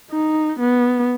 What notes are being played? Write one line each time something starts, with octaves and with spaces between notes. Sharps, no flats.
D#4
B3